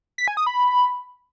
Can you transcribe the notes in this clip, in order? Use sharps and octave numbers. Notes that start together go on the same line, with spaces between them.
B6
G#5
D#6
B5